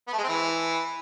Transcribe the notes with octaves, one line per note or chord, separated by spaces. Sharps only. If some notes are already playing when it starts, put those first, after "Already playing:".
B3
A3
G#3
C4
E3